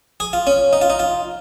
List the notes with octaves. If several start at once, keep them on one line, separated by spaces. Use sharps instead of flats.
G#4
F4
C#4
D#4
F4
D#4
F4